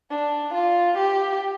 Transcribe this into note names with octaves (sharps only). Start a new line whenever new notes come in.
D4
F4
G4